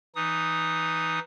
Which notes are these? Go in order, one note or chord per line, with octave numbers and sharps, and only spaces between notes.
E3 D#4 D#6